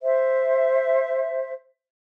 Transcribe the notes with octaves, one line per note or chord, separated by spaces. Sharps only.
C5 E5